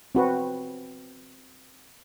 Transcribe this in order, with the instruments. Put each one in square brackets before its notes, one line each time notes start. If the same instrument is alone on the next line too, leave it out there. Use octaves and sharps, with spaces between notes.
[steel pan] C4 F#4 B4